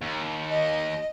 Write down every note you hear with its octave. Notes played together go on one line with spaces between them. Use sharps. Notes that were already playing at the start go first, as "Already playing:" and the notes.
D#2
D#5